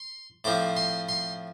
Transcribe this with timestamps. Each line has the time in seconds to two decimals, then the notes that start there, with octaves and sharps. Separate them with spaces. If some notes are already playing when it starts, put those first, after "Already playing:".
Already playing: C6
0.44 A2 F3 C4 D6
0.76 C6
1.09 C6